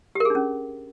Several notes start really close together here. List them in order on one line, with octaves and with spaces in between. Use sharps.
G4 A#4 G#4 D4 C#4